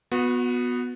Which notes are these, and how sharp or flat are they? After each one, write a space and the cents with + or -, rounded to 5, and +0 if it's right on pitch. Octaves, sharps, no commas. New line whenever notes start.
B3 +0 F#4 -30